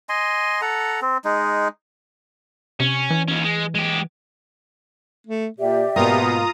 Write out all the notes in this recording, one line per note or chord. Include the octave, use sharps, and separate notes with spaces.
D#5 G#5 C6
A4 F#5 A#5
C4
G#3 D#4
C3 C#4
E3
D#2 C#4
G#3
G#3 G4
A3
A#2 G4 D5 E5
G#2 B2 A#3 F4 A#4 A#5 D#6